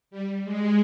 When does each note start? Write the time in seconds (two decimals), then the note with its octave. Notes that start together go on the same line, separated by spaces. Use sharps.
0.11 G3
0.44 G#3